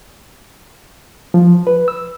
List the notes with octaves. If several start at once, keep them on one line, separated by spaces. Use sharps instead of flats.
F3
B4
E6